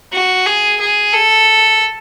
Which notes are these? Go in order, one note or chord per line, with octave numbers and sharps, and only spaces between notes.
F#4
G#4
G#4
A4